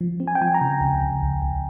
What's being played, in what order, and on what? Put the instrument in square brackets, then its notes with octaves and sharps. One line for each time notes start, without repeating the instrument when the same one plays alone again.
[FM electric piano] F3
C4
G#5
G5
F3 G#5
A#5
C#3
C#2
C#2
C#2
C#2